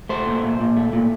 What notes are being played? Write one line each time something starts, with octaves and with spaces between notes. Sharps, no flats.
A3 C5
A#2
A#2
A#2
A3
A#2